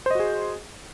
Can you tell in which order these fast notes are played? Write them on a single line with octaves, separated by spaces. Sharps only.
C5 D#5 F#4 G#4